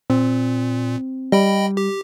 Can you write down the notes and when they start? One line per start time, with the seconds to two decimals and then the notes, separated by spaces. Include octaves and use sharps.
0.10 A#2 C4
1.32 G3 D#5 G5 B5
1.77 G4